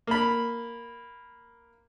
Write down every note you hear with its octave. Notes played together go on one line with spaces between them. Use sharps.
A#3 B5